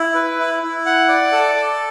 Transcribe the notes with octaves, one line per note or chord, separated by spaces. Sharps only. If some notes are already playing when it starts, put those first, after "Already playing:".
Already playing: E4
B4
E4
E4
F#5
D5
A4
A4